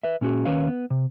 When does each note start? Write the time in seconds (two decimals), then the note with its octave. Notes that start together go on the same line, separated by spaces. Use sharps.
0.03 B4 E5
0.21 A#2 C#4 D#4 F#4 G#4
0.45 D#2 D#3 C#4 B4 C#5 F5
0.68 B3
0.90 C3